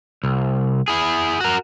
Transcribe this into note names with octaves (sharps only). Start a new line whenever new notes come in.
C2
E4 G#4
F#4 A#4